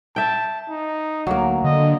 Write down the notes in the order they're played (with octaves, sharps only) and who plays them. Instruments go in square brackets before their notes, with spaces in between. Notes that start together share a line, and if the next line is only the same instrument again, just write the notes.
[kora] E5 G5 [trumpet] A5
[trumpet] D#4
[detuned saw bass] D2 [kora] F#3 A#3
[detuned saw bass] D3 [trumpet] D#5